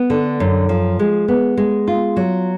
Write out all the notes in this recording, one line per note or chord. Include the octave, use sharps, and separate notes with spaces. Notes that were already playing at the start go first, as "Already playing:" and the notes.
Already playing: B3
D3
F#2
F3
G#3
B3
G#3
F4
F#3